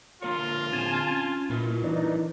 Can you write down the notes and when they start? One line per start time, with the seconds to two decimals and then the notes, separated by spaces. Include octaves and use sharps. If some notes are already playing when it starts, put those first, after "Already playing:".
0.22 D3 A#3 F4 A#4 C#5
0.73 D3 C4 D4 G#5 A5
1.11 C#4
1.50 A#2 E4 A#4 B4
1.84 E3 D4 D#4